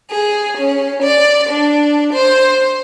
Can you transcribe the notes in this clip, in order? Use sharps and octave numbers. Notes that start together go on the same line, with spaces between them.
G#4
C#4
D5
D4
C5